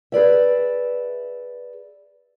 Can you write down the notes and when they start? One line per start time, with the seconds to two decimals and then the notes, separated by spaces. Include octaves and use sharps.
0.12 G#4 B4 D5 E5